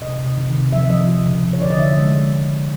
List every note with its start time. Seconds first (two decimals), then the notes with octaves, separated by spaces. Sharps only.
0.01 C3 D#5
0.19 C3
0.37 D#3
0.54 C3
0.72 F3 E5
0.90 F3 D#5
1.08 F3
1.26 C#3
1.43 F3
1.53 C#5
1.61 D3 D5
1.70 D#5
1.79 D3 E5
1.97 G#3